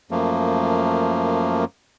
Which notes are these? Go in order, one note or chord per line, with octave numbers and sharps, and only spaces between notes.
F#2 F3 A3 A#3